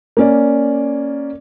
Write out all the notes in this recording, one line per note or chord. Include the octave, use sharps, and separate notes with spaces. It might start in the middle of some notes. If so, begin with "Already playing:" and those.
A#3 C#4 D5